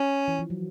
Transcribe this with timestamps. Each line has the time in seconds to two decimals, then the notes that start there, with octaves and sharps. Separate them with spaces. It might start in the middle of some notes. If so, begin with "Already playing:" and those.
Already playing: C#4
0.28 E3
0.39 F3
0.50 F#3